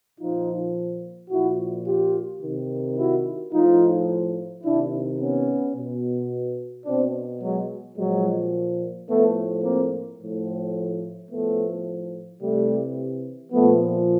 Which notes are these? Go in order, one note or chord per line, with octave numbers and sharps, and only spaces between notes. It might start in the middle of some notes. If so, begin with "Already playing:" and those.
A#2 F3 D#4 F4
A#2 F3 E4 F#4
F4 G4
C3 D#3
E4 F#4
A2 F3 D#4 F4
C3 D#3 D4 E4
B3 C#4
B2
B2 C4 D4
F#3 G#3
A#2 F3 F#3 G#3
A2 F3 A3 B3
A#3 C4
A2 F3
A2 F3 A3 B3
C3 E3 G3 A3
A#2 F3 A3 B3